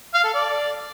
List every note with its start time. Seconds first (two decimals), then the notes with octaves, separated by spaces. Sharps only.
0.14 F5
0.24 A4
0.34 D5